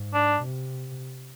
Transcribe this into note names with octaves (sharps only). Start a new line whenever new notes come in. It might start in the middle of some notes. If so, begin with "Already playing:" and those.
Already playing: G#2
D4
C3